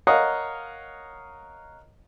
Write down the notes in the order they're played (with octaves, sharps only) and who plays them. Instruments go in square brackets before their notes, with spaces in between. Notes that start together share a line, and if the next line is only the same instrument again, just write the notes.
[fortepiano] A#4 C#5 D#5 F5 F#5